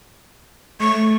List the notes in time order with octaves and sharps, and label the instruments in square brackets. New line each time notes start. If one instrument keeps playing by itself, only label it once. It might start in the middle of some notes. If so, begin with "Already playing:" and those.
[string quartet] A3 [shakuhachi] C#6